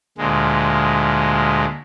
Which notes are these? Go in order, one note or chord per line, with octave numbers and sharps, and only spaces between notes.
D2 A#2 G#3